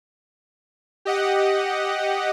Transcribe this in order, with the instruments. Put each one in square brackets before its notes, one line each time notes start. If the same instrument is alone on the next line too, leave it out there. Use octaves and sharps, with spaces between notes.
[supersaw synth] G4 D#5 F#5